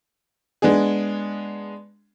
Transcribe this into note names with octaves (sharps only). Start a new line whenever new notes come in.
G#3 B3 D4 G#4